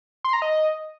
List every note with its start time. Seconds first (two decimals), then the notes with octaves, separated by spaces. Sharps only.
0.24 C6
0.33 A#5
0.42 D#5